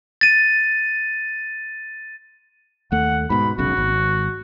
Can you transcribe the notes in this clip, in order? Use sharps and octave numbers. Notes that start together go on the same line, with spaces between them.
A6 D#7
D#2 A3 F#5
G#2 B2 B5
F1 B1 C#3 F#4
G#1